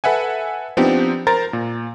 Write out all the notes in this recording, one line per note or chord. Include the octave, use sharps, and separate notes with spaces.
A4 B4 E5 F#5 G#5
F3 B3 C4 D4 D#4 G4
A#4 C5 A#5 A6
A#2